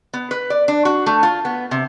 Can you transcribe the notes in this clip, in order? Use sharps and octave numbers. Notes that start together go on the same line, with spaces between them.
B3
B4
D5
D4
F#4
A3
F4
B3
C3